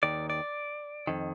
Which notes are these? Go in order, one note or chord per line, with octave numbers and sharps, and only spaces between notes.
D#2 D#3 D5
D5
F2 D#3